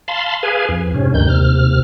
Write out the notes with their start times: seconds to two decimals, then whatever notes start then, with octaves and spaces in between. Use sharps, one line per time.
0.08 F5 A5 B5 C6
0.43 G#4 B4 F5 G#5
0.69 F2
0.94 G#2 C3 C#4
1.14 D2 G2 D#3 G6
1.28 D#2 C3 F6